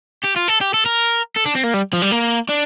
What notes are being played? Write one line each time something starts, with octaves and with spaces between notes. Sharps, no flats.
G4
F4
A4
G4
A4
A#4
A4
D4
C4
A#3
G3
F3
G3
A#3
D4